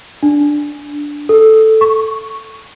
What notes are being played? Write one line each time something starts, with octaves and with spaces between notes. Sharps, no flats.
D4
A4
C#6